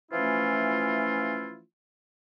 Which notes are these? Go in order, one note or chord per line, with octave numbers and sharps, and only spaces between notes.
E3 F3 A3 C#4 E4 F4